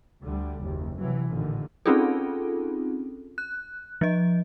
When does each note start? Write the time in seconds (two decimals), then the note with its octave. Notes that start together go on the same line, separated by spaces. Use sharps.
0.23 D2 D3 G3
0.63 F#1 D#2
0.97 C3 E3 F#3
1.29 A1 A#2 D3 D#3
1.86 C4 C#4 D#4 F4 G#4 A4
3.38 F#6
4.01 F3 D#5